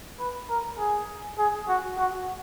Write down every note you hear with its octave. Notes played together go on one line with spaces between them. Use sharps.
B4
A#4
G#4
G#4
F#4
F#4